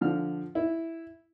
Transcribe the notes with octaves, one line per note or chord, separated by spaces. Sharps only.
D3 F3 F6
E4